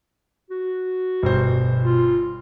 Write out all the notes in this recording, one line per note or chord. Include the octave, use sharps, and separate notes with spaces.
F#4
G1 B2 C5
F4